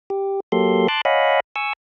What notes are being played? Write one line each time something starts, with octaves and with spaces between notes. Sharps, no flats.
G4
F#3 A#3 G4 A4 C6
A5 C6 D6 F#6
C#5 D#5 F5 F#5 G#5 B5
G#5 C#6 E6